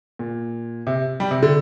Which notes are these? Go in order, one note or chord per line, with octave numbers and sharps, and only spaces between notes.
A#2
C3
G3
C3
D3